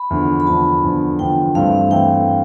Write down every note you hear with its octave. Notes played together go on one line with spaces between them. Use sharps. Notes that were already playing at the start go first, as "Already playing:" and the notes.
Already playing: B5
E2 D3 F3
B5
E2 D3 F3 A5
E2 D3 F3
E2 D3 F3 G5
G2 E3 A3 C4 F5
E3 A3 C4 G5